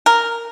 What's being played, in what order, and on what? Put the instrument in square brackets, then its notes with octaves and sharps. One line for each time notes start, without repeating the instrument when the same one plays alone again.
[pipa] A#4